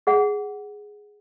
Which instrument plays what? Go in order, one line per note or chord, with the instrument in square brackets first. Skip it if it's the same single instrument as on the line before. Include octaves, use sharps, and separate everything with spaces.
[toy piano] G#4 F#5